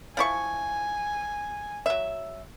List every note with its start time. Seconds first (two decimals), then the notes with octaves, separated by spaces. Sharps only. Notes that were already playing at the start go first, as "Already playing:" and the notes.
0.17 F3 E4 G#5 C#6
1.86 F#3 E5